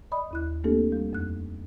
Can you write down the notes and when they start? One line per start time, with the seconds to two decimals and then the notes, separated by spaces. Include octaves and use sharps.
0.12 D5 D#5 B5 D#6
0.31 D#2 E4 F#6
0.64 A3 A#3 C4 D4 G4 A4
0.92 G3
1.13 F2 F#6